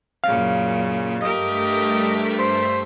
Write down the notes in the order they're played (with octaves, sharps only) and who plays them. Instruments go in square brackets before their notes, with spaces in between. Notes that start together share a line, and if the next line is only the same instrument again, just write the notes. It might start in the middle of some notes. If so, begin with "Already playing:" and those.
[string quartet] F#2 A#2 C#3 [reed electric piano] F5
[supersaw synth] G2 A3 B6 [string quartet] G4 A#4 [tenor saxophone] D#5
[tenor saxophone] C5